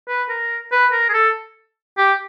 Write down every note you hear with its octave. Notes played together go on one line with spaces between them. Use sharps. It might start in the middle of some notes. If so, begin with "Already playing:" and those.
B4
A#4
B4
A#4
G#4
A4
G4